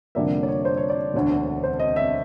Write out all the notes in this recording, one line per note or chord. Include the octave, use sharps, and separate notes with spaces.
F1 F2 D3 G3 A#3 E5
D5
C#5
C5
C#5
D5
E1 D2 D3
C5
D#5
E5